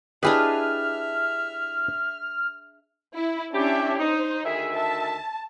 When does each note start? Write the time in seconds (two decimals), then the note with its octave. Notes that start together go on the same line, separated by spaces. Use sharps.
0.23 D4 E4 G4 G#4 B4 D#5 E5 F6
3.15 E4
3.54 C#4 D4 E4 G4 E5
3.99 D#4 C5
4.45 D2 D#3 G#4 E5
4.75 A5